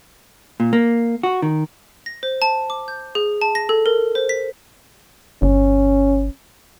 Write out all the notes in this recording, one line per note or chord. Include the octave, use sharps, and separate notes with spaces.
A#2
A#3
F#4
D#3
A#6
C5
A5
D6
G6
G#4
A5
A#6
A4
A#4
C5
B6
G1 C#4